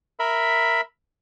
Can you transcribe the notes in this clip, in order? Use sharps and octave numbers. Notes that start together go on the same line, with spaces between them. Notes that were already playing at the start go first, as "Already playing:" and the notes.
A#4 E5 B5